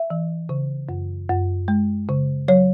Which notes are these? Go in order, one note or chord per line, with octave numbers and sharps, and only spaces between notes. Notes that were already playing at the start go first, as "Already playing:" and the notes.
Already playing: E5
E3
C#3
F#2
F#2
G#3
C#3
F#3 C#5